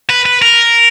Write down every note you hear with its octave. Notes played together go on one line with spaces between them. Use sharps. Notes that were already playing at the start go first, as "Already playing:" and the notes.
B4
B4
A#4